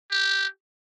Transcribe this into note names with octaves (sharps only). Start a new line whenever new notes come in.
G4